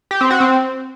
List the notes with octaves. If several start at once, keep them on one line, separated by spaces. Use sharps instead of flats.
G4
C4
F#4
C4